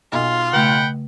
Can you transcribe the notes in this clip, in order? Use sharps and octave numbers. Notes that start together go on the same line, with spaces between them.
B1 F4
C#3 A3 F#5 G5 B5